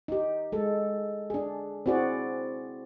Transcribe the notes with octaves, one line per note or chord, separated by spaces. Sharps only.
D#4 G4
G#3 A4
D4 G#4
C4 E4 F#4 G#4 D5